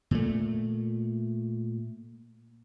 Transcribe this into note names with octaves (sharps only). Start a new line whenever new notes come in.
A#2 A3